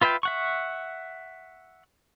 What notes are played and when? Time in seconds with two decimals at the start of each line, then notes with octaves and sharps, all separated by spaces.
0.01 F4 B4 E5 F5 G5
0.23 E5 F#5 C#6